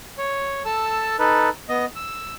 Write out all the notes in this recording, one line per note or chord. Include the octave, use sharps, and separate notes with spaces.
C#5
A4 A5 E6
D#4 A4 B4
B3 D#5
E6